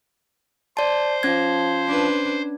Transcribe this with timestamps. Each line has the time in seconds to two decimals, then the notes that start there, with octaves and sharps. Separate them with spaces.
0.77 C5 D5 A5
1.23 F3 C#4 G#6
1.87 D4 B4